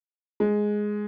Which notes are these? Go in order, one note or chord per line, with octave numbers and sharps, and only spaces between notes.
G#3